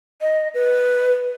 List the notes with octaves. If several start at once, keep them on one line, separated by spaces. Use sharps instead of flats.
D#5
B4